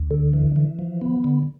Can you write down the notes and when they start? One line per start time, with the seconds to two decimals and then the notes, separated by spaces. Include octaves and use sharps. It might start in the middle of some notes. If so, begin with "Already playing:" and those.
Already playing: D2
0.11 D3
0.33 E3
0.56 E3
0.79 F3
1.01 B3
1.24 D3